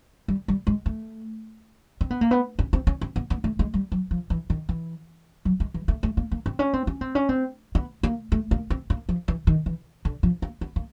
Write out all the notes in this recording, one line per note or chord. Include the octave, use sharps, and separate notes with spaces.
G3
G3
G#3
A3
C4
B3
A#3
B3
C#4
C4
C#4
C4
B3
B3
A3
G#3
G3
F#3
F3
E3
D#3
E3
F#3
G#3
E3
A3
A3
A#3
A#3
C4
C#4
C4
C#4
C4
C#4
C4
B3
A#3
A3
A#3
C4
A#3
F3
E3
D#3
E3
D3
F3
A#3
B3
A#3